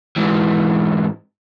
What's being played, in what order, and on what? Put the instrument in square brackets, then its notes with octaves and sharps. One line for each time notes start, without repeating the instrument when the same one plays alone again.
[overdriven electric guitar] G#2 E3